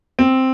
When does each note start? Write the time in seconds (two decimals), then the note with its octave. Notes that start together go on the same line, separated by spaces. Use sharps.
0.19 C4